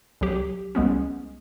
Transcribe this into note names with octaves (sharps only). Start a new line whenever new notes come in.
C2 F#3 G4
C2 G#3 B3 C#4